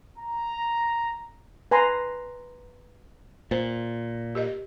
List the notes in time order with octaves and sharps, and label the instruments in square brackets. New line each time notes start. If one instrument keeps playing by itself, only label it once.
[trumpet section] A#5
[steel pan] B4 G#5 A#5 C6
[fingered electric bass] A#2 [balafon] C5
[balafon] G4 A#4 D#5